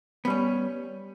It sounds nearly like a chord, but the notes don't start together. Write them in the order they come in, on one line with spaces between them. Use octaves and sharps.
B3 G3 C#4